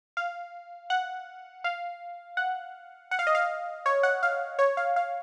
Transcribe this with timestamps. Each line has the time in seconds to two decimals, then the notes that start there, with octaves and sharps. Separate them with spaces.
0.17 F5
0.90 F#5
1.64 F5
2.37 F#5
3.11 F#5
3.19 F5
3.27 D#5
3.35 F5
3.86 C#5
4.03 F#5
4.23 F5
4.59 C#5
4.77 F5
4.96 F5